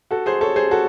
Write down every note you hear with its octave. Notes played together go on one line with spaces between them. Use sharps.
F#4 A4
G#4 C5
A4 C#5
G#4 C5
F#4 A4